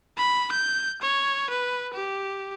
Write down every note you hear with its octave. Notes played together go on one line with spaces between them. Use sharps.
B5
G6
C#5
B4
G4